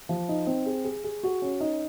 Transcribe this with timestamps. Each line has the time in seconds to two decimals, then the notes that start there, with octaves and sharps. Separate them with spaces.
0.09 F3
0.29 D#4
0.47 C4
0.66 G#4
0.84 G#4
1.04 G#4
1.23 F#4
1.42 C#4
1.60 D#4